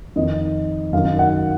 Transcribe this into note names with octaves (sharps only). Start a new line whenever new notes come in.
F2 D#3 D#5
F#2 D#3 F5
F#5